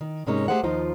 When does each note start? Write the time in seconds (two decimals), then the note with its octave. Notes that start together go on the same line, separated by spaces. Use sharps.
0.01 D#3
0.27 G#2 C3 G#3 A#3 C#4 D#4
0.48 A3 G4 G#4 C5 F5 F#5
0.64 D#2 F3 D#4 F4 C5